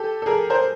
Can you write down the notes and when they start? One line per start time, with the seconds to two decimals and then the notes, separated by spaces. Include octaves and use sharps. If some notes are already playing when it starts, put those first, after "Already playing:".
Already playing: G4 A4
0.22 A4
0.26 G#4 A#4
0.50 A#4 C5